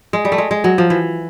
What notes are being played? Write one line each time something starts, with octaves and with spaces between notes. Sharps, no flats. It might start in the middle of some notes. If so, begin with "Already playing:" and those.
G#3
G3
A3
G#3
G#3
F#3
F3
E3